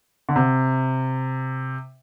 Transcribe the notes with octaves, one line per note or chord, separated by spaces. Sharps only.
D3
C3